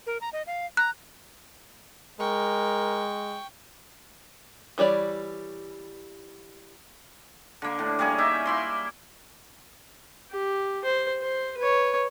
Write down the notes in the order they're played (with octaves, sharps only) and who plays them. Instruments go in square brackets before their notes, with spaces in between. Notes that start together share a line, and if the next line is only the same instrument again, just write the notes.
[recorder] A#4
A#5
D#5
F5
[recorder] A#5 [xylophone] F#6
[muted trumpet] G#3 [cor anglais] A#4 [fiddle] G5 C#6
[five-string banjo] E3 G3 C#5 D5
[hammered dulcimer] D3 A#3
A2 D4
G3 A#3 C#4 G#4
A#3 D#4 E5
A#3 E4 C6
[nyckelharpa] G4
C5
C5
B4 C#5